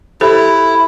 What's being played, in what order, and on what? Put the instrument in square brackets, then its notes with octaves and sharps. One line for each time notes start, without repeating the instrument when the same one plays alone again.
[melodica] E4 [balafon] G4 A4 C5